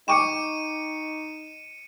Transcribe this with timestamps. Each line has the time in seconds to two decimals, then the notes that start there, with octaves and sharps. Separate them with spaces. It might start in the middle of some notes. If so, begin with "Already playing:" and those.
0.08 D#4 G5 C#6 D6 C#7 D#7 E7